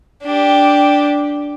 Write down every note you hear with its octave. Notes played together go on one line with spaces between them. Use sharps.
D4 G4